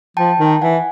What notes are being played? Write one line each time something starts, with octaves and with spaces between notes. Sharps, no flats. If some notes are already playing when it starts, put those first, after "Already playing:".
F3 G5 A5
D#3
E3 F#5 G#5